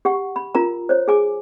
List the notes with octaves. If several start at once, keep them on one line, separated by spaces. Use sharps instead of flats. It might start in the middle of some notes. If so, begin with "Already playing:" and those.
G4 F#5 C#6
B5
F4 A#4 A#5
C5 C#5
G#4 G#5 D6